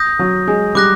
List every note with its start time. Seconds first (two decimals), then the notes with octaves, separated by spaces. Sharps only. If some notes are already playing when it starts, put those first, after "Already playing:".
Already playing: D#6 G6 A#6
0.19 F#3
0.47 G#3
0.75 G3 D6 F#6 A#6